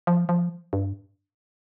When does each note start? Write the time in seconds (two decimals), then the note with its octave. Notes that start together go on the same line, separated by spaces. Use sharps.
0.07 F3
0.29 F3
0.73 G2